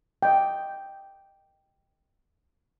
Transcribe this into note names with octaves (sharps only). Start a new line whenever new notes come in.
D#5 G5